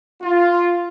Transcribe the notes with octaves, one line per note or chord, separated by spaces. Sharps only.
F4